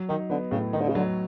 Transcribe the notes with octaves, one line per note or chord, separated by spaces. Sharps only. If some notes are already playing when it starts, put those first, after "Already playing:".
Already playing: F#3
D#3 D#4
D3 B3
A2 C#3
D#3 D#4
D3
C#3
D3 F#3